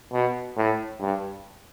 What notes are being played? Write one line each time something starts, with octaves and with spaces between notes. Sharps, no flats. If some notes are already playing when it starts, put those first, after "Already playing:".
B2
A2
G2